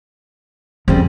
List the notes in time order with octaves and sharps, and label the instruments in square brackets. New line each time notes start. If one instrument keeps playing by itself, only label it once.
[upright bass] F2 [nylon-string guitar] C#3 G3 C4